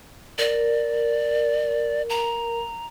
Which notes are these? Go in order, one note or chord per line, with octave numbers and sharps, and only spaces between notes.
A#4 D5
A#5